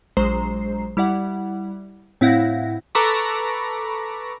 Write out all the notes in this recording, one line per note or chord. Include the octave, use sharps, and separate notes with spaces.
A#1 F#3 G#3 C5 A#5 C7
G3 E4 D5 F#5
A2 C4 E4 F5 F#5 A#6
A4 B4 A#5 B5 C#6 D6